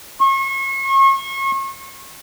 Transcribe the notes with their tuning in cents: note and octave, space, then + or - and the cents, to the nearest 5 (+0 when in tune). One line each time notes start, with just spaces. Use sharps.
C#6 -35